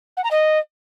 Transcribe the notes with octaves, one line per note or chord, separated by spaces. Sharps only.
F#5
A#5
D#5